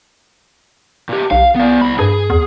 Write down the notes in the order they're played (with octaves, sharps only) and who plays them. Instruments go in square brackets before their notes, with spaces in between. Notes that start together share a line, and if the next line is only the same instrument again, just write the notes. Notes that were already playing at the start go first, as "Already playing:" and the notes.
[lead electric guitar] A#2 G4
[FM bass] B1 [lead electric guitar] F5
[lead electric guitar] B3 D5
C2 B5
[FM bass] G2 [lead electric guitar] G#4
[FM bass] E2